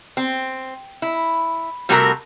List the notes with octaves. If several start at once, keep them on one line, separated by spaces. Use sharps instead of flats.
C4
E4
C3 G3 A3 C4 F#4 A#4